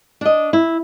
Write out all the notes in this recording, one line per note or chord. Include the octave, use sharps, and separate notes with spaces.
D4 D#5
E4